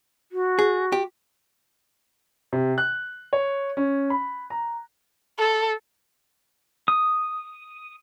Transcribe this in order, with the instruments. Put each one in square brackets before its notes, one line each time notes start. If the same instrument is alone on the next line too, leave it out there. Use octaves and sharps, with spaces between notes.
[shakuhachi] F#4
[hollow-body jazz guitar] G#4
G4
[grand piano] C3
F#6
C#5
C#4
B5
A#5
[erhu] A4
[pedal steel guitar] D#6